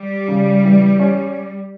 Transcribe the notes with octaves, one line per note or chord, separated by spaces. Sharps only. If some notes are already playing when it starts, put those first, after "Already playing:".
Already playing: G3
C#3
E3
C#4